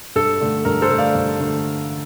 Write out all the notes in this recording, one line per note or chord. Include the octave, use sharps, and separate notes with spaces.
G2 A4
D3 A3 D4
G2 A#4
A4 C5
D3 A3 D4
D5 F5
G2
D3 A3